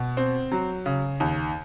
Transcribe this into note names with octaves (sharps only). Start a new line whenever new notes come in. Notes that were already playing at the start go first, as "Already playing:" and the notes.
Already playing: B2
C4
F#3
C#3
D#2